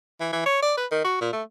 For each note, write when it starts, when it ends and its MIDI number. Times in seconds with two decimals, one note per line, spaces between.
0.20 0.29 52
0.33 0.45 52
0.46 0.58 73
0.62 0.74 74
0.77 0.86 71
0.92 1.00 51
1.04 1.18 66
1.21 1.31 46
1.33 1.43 57